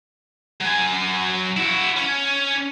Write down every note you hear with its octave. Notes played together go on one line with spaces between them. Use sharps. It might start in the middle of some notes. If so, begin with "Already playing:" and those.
F#3 G#5
E4 F#4
C#4